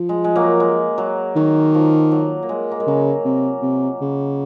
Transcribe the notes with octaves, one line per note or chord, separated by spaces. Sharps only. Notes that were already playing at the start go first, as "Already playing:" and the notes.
Already playing: F3
G#3
G#3
F#3 A#3
G#3
F#3
D#3 F#3
F3
F#3
A#3
G#3
A#3
G#3
C#3 F#3
C3
C3
C#3